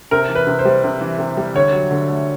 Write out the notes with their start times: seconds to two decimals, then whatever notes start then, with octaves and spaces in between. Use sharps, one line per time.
0.11 C3 A#4
0.29 E3
0.35 B4
0.47 C3
0.59 C5
0.65 G3
0.84 C3
1.01 E3
1.19 C3
1.37 G3
1.55 D3 C#5
1.73 F#3
1.91 D3
2.09 A3